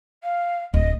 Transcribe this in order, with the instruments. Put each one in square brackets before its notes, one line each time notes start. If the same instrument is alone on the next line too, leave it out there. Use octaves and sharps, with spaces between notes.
[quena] F5
[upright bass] D1 [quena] D#5